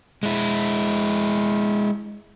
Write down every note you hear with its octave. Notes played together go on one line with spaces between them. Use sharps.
G#3 E4